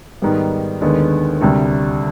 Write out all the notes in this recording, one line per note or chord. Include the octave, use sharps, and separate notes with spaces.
G#2 D#3 G3 B3
D#2 D3 G#3 B3
D2 C3 G3